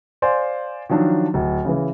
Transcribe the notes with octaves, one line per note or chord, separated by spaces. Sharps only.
C5 D5 F5 G#5 C6
D#3 F3 F#3 D4
D1
C#3 E3